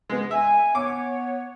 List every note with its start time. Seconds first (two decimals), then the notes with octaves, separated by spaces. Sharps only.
0.10 G#3 B3
0.31 E5 G#5
0.75 B3 C#5 D6